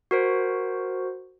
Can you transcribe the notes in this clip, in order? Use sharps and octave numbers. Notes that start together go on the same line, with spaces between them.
F#4 A#4 C5